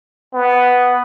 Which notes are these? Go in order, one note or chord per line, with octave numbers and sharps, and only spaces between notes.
B3